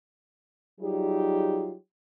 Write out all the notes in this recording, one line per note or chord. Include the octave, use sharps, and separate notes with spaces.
F#3 G3 D#4 F4 G4 G#4